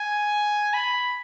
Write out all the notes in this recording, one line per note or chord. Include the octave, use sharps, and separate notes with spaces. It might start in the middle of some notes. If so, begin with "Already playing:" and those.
Already playing: G#5
B5